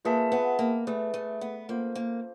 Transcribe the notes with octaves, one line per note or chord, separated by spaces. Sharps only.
A#3 F4 G#4 B4 E5 A5
B3
A#3
A3 G#4 B4 D5
A3
B3
A#3 C#4 F4 A4 C5 F5
A#3